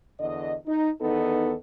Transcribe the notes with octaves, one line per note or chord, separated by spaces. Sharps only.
E2 D3 D#5
D#4
E2 D#3 B3 D#4 A4